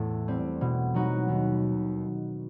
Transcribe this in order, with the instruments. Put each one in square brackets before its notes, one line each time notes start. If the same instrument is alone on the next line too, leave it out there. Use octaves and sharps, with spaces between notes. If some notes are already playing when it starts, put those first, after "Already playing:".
Already playing: [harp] E2 A2 A3
G3 C4
B2
F#3 B3 D#4 F#4
D#2